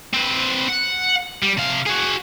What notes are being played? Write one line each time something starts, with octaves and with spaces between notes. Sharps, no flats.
C4 B4
F#5
G3
C3 F5
F#4 G#4